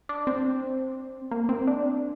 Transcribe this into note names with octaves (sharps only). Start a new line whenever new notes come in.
D4
C4
A#3
C4
D4